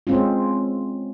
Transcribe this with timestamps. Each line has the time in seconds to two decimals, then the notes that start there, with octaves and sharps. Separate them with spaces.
0.07 G#3 C4 C#4 F4